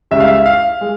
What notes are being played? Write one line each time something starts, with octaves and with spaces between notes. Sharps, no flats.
C#2 C#3 G3 E5
F5
E5
F5
G#3